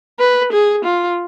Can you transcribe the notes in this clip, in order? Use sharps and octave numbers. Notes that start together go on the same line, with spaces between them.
B4
G#4
F4